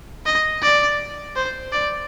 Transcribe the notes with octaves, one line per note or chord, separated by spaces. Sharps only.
D#5
D5
C5
D5